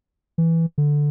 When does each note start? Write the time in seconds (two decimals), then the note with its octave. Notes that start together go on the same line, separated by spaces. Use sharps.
0.38 E3
0.78 D3